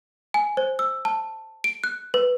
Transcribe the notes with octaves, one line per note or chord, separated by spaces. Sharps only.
G#5
C5
E6
A5
D7
F#6
B4